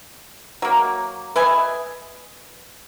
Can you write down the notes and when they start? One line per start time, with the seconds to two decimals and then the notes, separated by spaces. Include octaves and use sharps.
0.62 F#3 A#3
1.36 B4 D#5 E5 G#5